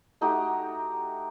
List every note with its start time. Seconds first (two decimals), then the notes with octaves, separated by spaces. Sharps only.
0.21 A3 D#4 F#4 G4